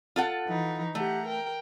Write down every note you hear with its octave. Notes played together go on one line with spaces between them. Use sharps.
F4 A4 F#5
E3 D#4
A3 G4 F#5 A#5
A#4 G5